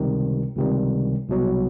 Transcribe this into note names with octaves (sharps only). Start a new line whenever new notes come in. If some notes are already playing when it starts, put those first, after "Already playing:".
Already playing: C#2 C3 D#3 G3
C#2 C3 D#3 G3
C2 B2 F#3